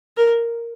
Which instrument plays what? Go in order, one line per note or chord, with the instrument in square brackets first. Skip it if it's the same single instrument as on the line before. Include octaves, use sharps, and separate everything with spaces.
[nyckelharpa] A#4